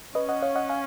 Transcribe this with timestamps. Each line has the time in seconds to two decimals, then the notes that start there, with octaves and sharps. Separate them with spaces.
0.15 C#4 B4 D#5
0.29 D#5 F#5
0.42 C#5 F5
0.55 D#5 F#5
0.69 F5 G#5